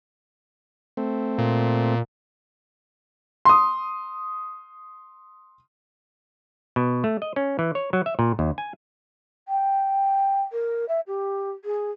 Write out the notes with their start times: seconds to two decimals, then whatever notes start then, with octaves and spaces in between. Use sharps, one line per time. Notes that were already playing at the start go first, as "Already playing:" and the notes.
0.97 A3 C4
1.38 A#2
3.45 C6 D#6
6.76 B2
7.04 A3
7.22 D#5
7.36 C#4
7.59 E3
7.75 C#5
7.93 F#3
8.06 E5
8.19 A#2
8.39 D#2
8.58 G#5
9.48 G5
10.52 A#4
10.89 E5
11.07 G4
11.65 G#4